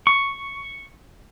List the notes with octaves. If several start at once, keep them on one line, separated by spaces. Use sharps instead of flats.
C#6